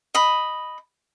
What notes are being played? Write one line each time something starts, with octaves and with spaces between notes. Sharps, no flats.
D#5 B5